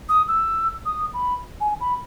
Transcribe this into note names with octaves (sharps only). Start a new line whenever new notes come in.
D#6
E6
D#6
B5
G#5
B5